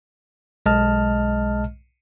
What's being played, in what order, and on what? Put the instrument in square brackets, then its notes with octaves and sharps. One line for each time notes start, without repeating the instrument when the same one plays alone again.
[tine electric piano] B1 G#3 D#5 A5 F6